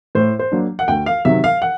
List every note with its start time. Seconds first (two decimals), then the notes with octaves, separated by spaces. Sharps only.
0.15 A2 C5
0.39 C5
0.52 F#3 A#3 D4
0.79 F#5
0.88 D2 G5
1.06 F5
1.25 C3 D#3 F#3 E5
1.44 F5
1.62 F#5